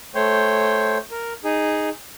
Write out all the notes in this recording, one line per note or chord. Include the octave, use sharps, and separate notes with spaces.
A3 C5 C#5 G5
A#4
D#4 G#4